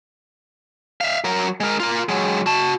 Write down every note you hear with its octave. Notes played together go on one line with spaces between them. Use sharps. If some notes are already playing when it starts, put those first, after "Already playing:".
E5 F5
F#3 A#4
G#3 A#4
F4 A#4
F#3 G#3
F#4 A5